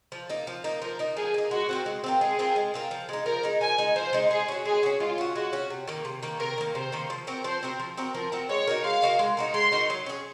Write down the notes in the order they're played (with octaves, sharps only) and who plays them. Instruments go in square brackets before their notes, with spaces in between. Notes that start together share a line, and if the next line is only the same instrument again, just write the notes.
[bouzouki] F3
A#3 D#4
F3
A#3 D#4
[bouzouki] F3 [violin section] A#4
[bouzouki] A#3 D#4
[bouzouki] F3 [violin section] G#4
[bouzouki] A#3 D#4
[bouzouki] G#3 [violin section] F#4
[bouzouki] C4 F4 A#4
G#3
C4 F4 A#4
[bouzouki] G#3 [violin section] G#4
[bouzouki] C4 F4 A#4
G#3
C4 F4 A#4
F3
G#3 D#4
[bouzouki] F3 [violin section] A#4
[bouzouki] G#3 D#4
[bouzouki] F3 [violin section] G#5
[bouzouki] G#3 D#4
[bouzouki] F3 [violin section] C5
[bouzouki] G#3 D#4
[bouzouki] G#3 [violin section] G#4
[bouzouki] C#4 F#4
[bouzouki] G#3 [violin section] G#4
[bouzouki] C#4 F#4
[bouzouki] G#3 [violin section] F4
[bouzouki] C#4 F#4
[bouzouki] G#3 [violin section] F#4
[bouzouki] C#4 F#4
C3
D#3 A#3
C3
D#3 A#3
[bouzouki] C3 [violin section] A#4
[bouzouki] D#3 A#3
[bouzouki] C3 [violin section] C5
[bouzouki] D#3 A#3
F3
C4 F#4 A#4
[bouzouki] F3 [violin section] C5
[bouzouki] C4 F#4 A#4
F3
C4 F#4 A#4
[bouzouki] F3 [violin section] A#4
[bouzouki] C4 F#4 A#4
[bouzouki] G#3 [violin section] C#5
[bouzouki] D#4 F#4 A#4
[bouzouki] G#3 [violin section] F5
[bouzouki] D#4 F#4 A#4
G#3
D#4 F#4 A#4
[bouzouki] G#3 [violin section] C6
[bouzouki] D#4 F#4 A#4
F#3
C#4 G#4